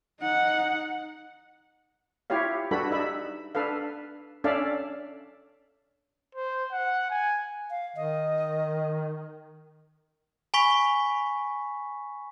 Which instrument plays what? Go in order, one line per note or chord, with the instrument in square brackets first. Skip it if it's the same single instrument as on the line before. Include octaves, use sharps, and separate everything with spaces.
[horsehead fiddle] D#4 F#5
[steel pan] E4 F4 G4 C#5 F5
G3 D4 F#4 A4 B4 B5
D#4 E5 B5
D4 A4 B4 F5
C#4 D4 A4 D5 E5 F5
[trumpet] C5
F#5
G#5
[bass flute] F5
[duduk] D#3 [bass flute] D#5
[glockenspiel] G#5 B5 C#6 B6